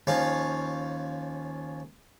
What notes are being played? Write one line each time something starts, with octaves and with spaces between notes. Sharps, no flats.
D#2 F3 C#4 F5